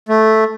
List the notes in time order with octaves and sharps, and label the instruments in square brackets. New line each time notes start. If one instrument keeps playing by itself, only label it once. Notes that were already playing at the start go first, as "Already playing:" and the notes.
[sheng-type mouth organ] A3